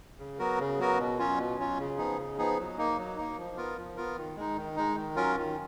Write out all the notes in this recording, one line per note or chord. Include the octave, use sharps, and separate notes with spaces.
C#3
F#3 B3 F#4 A#4
C#3
F#3 B3 F#4 A#4
B2
F#3 C#4 F4
B2
F#3 C#4 F4
C#3
F3 B3 D#4 G#4
C#3
F3 B3 D#4 G#4
F#3
A#3 D#4
F#3
A#3 D#4
F3
B3 F4 A#4
F3
B3 F4 A#4
D#3
G#3 D#4
D#3
G#3 D#4
D#3
F#3 C#4 F4 A#4
D#3